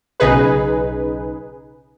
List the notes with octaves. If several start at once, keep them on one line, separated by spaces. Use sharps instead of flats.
B1 C#3 D#4 G#4 B4